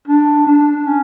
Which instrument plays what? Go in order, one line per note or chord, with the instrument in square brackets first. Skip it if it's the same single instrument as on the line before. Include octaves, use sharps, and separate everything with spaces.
[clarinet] D4
D4
C#4